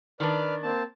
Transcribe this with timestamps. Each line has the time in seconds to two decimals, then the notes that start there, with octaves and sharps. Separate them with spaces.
0.20 D#3 D4 B4 D5 F6
0.63 A#3 C4 A5